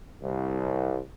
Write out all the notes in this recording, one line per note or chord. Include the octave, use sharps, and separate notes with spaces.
C2